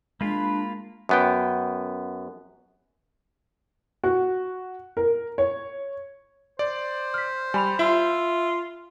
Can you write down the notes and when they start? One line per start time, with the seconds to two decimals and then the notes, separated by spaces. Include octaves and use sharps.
0.21 G#3 A#3 D4 F4 B5
1.09 F#2 B3 G5
4.04 F#4
4.97 A#4
5.38 C#5
6.59 C5 D5
7.14 F6 B6
7.54 G3 G#5 B5 F7
7.79 F4 E5